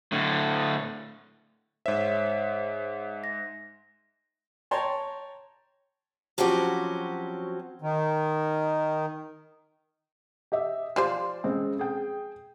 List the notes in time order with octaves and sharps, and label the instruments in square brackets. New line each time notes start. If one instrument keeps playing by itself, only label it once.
[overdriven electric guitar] A2 D3
[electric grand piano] G#2 E5 [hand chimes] C5 C#5
[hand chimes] A#6
[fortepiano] C#5 G5 A5 A#5 C6
[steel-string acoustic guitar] F3 F#3 C4 C#4 F#4 G4
[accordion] D#3
[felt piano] G4 D#5 E5
[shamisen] F3 G4 C5 [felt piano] D5 F5
[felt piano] C#3 G#3 C4
G#4 G5